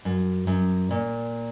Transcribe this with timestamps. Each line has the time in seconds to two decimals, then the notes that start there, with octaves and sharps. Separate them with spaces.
0.05 F#2
0.47 F#2
0.91 A#2